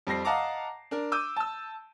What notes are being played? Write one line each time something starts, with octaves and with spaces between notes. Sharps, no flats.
F2 G3 C5 A#6 C7
D#5 F5 F#5 A5 A#5 D6
D4 A#4
D6 E6 G6 D#7
A5 E6